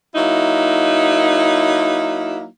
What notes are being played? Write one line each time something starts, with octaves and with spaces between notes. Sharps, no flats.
F#3 A#3 D#4 E4